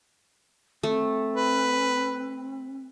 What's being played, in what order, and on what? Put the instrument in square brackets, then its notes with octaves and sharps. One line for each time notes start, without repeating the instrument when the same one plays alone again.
[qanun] A3 [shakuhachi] C4
[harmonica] B4